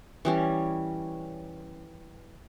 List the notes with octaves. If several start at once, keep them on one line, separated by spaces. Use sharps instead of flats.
E3 G3 C#4